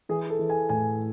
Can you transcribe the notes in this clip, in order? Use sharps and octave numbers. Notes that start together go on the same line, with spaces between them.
E3 G#4
A4
E3
G#5
A2 G#5